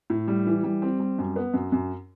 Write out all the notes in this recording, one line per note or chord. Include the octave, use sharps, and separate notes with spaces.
A2
G3
E3
G3
C4
G3
F#2
B3
F#2
F#2